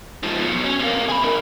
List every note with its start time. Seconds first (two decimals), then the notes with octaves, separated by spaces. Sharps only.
0.23 G#2 F3
0.41 B2 F#3
0.64 C#4
0.79 C3 A#3
1.08 G#4 B5
1.24 D4 A#4